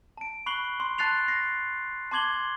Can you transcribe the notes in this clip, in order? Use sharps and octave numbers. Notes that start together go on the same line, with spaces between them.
A5 D7
B5 C#6 F#6 C7 F#7 G7
C6
A5 F#6 A6 C7 F7
A#6 C7
A5 C6 D6 G#6 F#7 G7